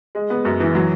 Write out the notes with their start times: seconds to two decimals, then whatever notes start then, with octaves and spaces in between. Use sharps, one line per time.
0.15 G#3
0.30 B3
0.45 F#2
0.60 E3
0.75 F#3